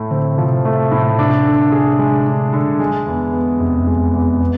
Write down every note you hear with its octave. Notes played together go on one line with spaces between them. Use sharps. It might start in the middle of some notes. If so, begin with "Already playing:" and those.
Already playing: A2 A3
D3 C4
C3 F3
A3
A2
C3 D4
D3
G#4
G#3
D4
D3
G#3
E2
B3
F2 C3
E2
F2
G#3
E2
B3